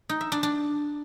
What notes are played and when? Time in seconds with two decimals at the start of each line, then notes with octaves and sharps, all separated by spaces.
0.09 D#4
0.21 E5
0.32 D4
0.43 D4